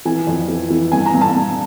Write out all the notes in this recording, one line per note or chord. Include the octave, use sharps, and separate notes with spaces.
E3 G#5
F2
E3
E3
G2 G#5
A#5
G2
A5
G2